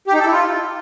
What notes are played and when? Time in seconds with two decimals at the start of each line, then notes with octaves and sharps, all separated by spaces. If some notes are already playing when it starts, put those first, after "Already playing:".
0.07 G4
0.13 D#4
0.20 A4
0.26 E4
0.32 F4